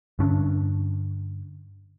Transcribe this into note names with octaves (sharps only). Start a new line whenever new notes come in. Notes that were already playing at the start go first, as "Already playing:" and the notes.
G2 D3 C#4 D4